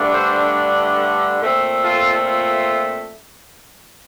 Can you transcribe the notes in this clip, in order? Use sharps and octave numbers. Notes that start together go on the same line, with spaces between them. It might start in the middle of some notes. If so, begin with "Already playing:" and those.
Already playing: G2 D3 A3 D4
A4 C5
A#2 A3 C4
F4 A4
F4